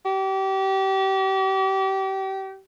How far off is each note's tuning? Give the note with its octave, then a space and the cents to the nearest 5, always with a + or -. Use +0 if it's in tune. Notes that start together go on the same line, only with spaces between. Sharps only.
G4 -30